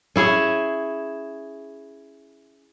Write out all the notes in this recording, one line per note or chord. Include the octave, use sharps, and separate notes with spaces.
C#4 E4 G#4